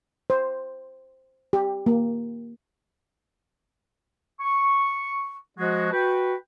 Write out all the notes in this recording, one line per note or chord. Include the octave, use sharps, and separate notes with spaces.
C5
G4
A#3
C#6
F3 G#3 F#4
F#4 B4 G5